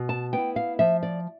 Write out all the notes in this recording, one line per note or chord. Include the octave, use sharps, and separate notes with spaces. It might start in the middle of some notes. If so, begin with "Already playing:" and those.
Already playing: B2
A5
B3 E4 G5
F5
F3 E5
D5